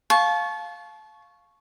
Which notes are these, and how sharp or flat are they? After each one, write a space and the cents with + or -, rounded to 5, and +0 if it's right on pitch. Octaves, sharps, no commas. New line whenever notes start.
F5 +10 A5 -30 C#6 +0